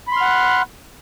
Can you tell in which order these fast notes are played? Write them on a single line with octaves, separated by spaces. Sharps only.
B5 C6 F6 F#5 F#6